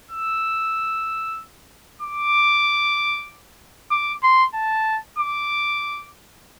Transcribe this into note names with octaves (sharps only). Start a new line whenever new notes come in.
E6
D6
D6
C6
A5
D6